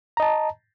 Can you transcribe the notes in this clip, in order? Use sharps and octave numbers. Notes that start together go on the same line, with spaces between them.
D#5 A5 A#5